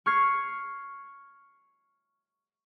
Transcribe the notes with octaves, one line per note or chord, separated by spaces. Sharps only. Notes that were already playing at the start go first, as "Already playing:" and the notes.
C#6 F6 G#6 C7